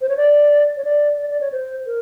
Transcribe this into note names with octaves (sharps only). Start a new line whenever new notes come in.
C5
C#5
D5
C#5
D5
D5
D5
C#5
C5
A#4